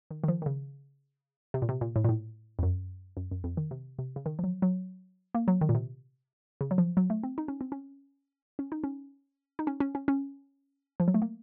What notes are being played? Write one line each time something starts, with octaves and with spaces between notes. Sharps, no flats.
D#3
D#3
F3
D#3
C#3
C3
A#2
C3
A#2
A2
A#2
A2
F2
F#2
F#2
F#2
F2
D#3
C3
C3
C#3
D#3
F3
F#3
F#3
A#3
F#3
D#3
A#2
C3
C#3
F#3
F3
F#3
A3
C4
D#4
C#4
C4
C#4
C#4
D#4
C#4
D#4
C#4
C#4
C#4
C#4
F3
F#3
A3
A#3